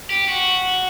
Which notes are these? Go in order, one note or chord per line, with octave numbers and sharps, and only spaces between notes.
G4
F#4